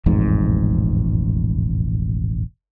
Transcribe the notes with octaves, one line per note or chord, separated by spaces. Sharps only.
E1 A1 F2 G#2